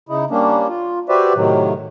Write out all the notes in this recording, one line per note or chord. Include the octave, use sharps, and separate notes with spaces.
C#3 D#4 E4
G3 A#3 C#4 D4
F4
F#4 G4 B4 C5 D5 E5
A2 C3 D#3 F#3